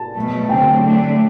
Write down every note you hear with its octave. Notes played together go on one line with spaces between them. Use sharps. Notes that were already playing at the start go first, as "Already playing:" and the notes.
Already playing: A5
B2 F#3 A3
D2 D3 F#3 C4 G5
D3 F#3 A3 D4